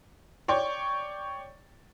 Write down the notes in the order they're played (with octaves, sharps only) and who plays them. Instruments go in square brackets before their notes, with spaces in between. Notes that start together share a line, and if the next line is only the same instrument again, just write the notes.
[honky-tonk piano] C#5 D5 G5 C#6